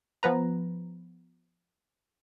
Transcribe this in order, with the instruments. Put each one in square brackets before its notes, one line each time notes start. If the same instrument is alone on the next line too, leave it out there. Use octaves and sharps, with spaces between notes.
[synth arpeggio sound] F3 B3 B4 A#5